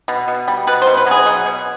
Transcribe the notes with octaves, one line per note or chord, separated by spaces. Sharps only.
B2
B2
G3
B2 B4
C5
B2
B4
F#3 G#4
B2
B2